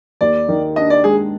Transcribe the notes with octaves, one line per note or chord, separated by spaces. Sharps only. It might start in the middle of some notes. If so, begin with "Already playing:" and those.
D#2 D5
D#3
D4 D#5
D5
G#3 G#4